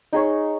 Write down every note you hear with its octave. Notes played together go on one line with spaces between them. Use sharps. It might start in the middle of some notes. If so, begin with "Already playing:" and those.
D#4 G#4 C#5